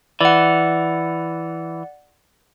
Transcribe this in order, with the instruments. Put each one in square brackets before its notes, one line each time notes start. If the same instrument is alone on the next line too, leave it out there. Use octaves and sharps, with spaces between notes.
[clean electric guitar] E3 [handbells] D5 F#5